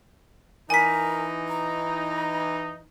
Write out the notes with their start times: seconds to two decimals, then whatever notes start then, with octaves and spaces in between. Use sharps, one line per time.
0.70 E3 D#4 A#4 G#5 B6
1.48 A#5